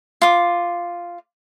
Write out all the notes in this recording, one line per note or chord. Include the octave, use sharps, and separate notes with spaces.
F4 D6